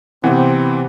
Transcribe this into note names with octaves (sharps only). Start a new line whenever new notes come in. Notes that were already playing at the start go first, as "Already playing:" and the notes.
C3 E3 B3 C4